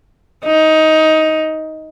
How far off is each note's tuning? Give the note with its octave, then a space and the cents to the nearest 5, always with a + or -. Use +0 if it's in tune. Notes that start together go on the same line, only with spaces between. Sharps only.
D#4 +15